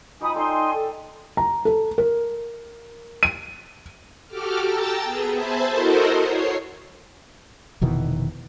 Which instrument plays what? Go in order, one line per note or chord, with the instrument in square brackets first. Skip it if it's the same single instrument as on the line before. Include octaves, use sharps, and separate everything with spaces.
[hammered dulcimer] F3 D#4 G4 [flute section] G#5 B5 D#6
[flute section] D#4 G#5 C6 [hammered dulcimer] G4 A4 D5
[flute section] A4
[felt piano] A#5
A4
A#4
D#7
[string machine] F#4 G4 A4 D6 F6
G5 A5 A#5 E6 A6
B3 G#4
C5 E5 G#5 A5 B5
E4 F#4 A4 A#4 C5 D#5
C#5 C7
[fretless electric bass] F1 B2 D#3 E3